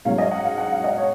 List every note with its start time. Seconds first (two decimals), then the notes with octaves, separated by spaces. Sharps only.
0.05 G#2 F#3 C#4 F5
0.18 D#5
0.31 F#5
0.45 F5
0.58 F#5
0.72 F5
0.84 D#5
0.98 C#5